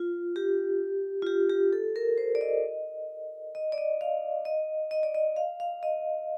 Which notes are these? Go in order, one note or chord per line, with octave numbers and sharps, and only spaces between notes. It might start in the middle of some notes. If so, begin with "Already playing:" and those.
Already playing: F4
G4
F4
G4
G4
A4
A#4
C5
D5
D#5
D#5
D5
D#5
F5
D#5
D#5
D5
D#5
F5
F5
D#5